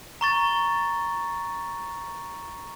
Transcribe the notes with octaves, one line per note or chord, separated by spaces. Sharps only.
A#5 C#6 A6